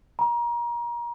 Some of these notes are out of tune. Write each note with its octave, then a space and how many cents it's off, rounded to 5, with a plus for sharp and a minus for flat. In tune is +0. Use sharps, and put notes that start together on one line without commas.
A#5 +30